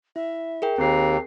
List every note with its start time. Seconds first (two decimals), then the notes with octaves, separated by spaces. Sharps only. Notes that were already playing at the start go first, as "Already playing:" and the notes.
0.16 E4 E5
0.62 G#4 A#4 G5
0.78 D#2 C4 A#5 C7